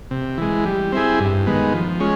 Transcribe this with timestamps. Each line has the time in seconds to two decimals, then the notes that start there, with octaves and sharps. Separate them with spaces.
0.11 C3
0.38 E3 G#3
0.65 G3
0.92 C4 E4 G#4
1.20 G2
1.47 D#3 G#3 B3
1.74 F3
2.00 G#3 C#4